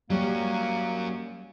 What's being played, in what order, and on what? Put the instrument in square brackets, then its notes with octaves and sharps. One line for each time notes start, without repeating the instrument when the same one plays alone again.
[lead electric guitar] F#3 C#4 [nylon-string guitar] G3 [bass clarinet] A#3